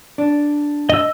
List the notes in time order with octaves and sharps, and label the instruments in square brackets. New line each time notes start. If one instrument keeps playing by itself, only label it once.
[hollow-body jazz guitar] D4
[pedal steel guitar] D#5 E6